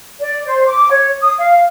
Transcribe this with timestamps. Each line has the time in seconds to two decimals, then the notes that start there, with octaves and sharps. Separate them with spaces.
0.20 D5
0.46 C5
0.66 D6
0.89 C#5
1.21 D#6
1.38 F5